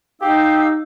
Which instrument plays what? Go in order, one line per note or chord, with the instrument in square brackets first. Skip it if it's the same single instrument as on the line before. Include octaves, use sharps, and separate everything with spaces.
[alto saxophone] D#4 [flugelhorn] G4 [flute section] F5 E6